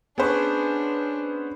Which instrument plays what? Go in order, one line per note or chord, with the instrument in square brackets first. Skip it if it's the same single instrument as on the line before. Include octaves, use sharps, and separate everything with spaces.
[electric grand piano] B3 C#4 C5 [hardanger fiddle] D4 [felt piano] G#4 B4 C#6